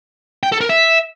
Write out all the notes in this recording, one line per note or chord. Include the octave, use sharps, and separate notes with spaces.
G5
A4
A#4
E5